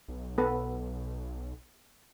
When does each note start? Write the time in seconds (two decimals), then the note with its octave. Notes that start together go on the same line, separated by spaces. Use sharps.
0.08 B1
0.38 B3 A4 B4